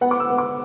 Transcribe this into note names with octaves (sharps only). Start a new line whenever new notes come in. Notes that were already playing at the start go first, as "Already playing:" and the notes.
B3 F#5
D6
E6
B3
D6